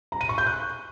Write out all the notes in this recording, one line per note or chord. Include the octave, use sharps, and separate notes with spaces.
A#5
D#7
C#6
G6
F#6